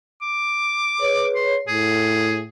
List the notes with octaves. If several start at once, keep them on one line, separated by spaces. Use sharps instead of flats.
D6
G#4 B4 C#5
C6
A2 G#4